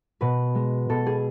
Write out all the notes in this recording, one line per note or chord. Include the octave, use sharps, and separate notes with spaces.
B2 B4
G#3
B2 A4
G#4